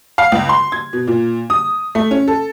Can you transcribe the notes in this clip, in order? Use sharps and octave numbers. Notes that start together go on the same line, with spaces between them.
F5
C#2
C6
G#6
B2
A#2
D#6
A3
C#4
A4